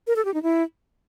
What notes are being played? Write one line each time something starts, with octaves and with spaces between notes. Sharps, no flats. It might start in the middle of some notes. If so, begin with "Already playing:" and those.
A#4
A4
G4
D#4
E4